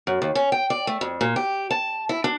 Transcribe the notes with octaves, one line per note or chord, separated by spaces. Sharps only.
F#2
D#2
C#4
G5
D5
A3
F2
A#2
G4
A5
E4
D4